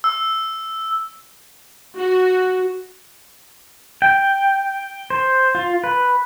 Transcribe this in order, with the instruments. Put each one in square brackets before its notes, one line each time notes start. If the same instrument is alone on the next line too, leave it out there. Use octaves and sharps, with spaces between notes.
[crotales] E6
[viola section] F#4
[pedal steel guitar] G5
C5
F4
B4